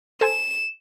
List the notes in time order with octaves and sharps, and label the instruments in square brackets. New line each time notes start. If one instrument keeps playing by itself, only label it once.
[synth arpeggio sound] A4 C5 G#5 [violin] E7